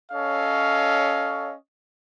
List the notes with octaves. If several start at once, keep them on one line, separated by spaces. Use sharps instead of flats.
C#4 A4 C#5 D#5 F5